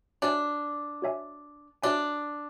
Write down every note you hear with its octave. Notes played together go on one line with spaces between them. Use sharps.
D4 F#4 C#5 E5 G#5
F#4 C#5 E5 G#5
D4 F#4 C#5 E5 G#5